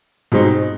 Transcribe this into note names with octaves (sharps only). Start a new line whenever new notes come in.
B2 G#3 C4 D#4